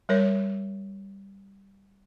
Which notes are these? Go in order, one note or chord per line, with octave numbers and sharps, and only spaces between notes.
G3 A#4 C#5